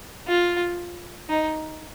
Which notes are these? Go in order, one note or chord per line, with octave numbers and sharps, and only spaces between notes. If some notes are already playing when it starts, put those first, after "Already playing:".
F4
D#4